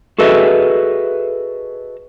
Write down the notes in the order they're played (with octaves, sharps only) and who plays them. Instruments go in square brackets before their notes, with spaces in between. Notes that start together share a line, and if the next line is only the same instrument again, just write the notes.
[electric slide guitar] F#4 G#4 A4 B4 D#5 E5